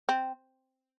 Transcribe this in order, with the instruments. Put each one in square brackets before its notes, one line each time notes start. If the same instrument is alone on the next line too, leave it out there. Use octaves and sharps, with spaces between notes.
[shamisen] C4